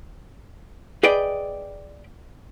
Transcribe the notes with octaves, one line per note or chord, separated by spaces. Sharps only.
G#4 B4 D5 D#5 G5